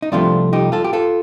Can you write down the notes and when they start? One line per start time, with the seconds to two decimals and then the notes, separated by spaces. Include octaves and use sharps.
0.02 D#4
0.12 C2 C3 F3 A3 D4 F4
0.53 D#4 G4
0.72 F4 A4
0.84 G4
0.93 F4 A4